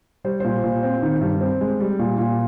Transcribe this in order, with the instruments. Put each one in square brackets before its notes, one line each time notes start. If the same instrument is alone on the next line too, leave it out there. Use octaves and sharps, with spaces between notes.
[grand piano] G3 C5
A#2 C5
A#2
C4
D#3
G2
C4
G#3
G3
A#2
A#2